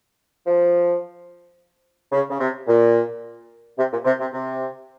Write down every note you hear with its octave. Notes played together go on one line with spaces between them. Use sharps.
F3
C#3
C#3
C3
A#2
C3
A#2
C3
C3
C3